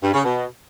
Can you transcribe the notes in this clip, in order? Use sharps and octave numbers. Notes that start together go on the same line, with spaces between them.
G2
C#3
B2